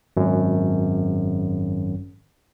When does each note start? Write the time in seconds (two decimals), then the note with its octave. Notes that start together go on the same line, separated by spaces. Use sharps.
0.17 G#1 F#2